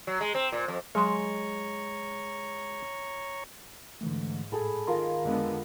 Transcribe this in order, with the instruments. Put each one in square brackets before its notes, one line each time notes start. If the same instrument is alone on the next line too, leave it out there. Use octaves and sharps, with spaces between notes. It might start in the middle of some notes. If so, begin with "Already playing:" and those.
[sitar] F#3
G#3
C4
A#2
F2
[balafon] F#3 C6 [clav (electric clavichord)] G#3 [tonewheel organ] C#5 A#5 C#6
[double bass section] G#2 [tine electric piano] D3 E3 A3
[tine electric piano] A2 [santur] G#4 A4 B5
[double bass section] D#3 [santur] F4 A#4 A#5 [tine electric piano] C6
[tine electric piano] F2 [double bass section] D3 G#3 B3